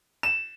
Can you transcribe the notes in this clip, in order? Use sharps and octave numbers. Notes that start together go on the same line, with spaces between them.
E7